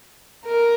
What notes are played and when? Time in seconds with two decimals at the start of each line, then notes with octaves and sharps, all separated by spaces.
0.46 A#4